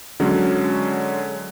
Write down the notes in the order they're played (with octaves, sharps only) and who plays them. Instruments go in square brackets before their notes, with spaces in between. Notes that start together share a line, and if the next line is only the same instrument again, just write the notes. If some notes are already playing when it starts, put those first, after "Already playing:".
[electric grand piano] D3 F#3 G#3 C#4